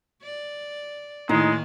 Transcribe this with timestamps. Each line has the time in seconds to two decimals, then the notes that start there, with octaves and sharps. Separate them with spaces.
0.23 D5
1.29 A2 D#3 G#3 A#3 D#4